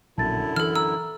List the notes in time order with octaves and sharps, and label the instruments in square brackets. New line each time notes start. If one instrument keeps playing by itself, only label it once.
[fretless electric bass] A#1 B2 F#3 [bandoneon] F#2 D3 E4 [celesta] A5 A6
[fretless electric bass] E3 [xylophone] A4 F6
[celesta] A#5 [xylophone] E6